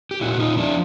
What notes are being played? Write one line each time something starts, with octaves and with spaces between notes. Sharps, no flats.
G4
A#2 E4 F#4
F#4
D#4 F4
F3 D4 E4